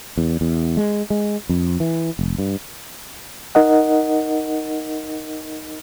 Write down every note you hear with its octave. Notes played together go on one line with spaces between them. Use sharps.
E2
E2
G#3
G#3
F2
E3
F1
G2
D#4 A#4 D#5 F#5